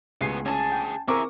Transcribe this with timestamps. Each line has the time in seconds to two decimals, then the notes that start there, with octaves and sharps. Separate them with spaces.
0.21 C#2 A2 A3 B3 G#5 C7
0.46 D2 C#4 G#4 G#5 A5
0.72 G5
1.08 C4 E4 G#4 A#4 E5 A#5 C#6 D6